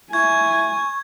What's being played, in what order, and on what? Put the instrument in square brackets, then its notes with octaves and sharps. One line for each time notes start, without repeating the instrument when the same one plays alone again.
[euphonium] E4 [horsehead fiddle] G#5 [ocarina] C#6 [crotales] G#6